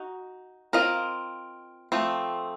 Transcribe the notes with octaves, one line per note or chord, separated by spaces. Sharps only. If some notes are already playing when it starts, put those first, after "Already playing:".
Already playing: D#4 F#4
C4 F4 A#4 D#5
F3 A3 C4